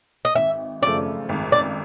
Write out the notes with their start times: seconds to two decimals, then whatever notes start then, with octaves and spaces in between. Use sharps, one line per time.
0.25 D#5
0.35 G#1 E5
0.82 F#2 C#3 F3 A3 D5
1.29 G#1
1.52 D5